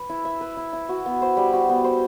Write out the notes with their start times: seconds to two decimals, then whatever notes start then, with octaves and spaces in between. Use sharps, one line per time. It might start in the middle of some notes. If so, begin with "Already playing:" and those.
Already playing: B4
0.10 E4
0.25 E5
0.41 B4
0.57 E4
0.73 E4
0.89 F#4
1.06 B3
1.22 C5
1.37 G3
1.53 F#4
1.69 B3
1.84 C5